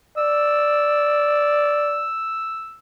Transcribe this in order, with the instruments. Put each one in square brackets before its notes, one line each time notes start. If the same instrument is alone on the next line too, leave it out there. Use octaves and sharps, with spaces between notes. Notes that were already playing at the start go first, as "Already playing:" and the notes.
[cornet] D5 [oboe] E6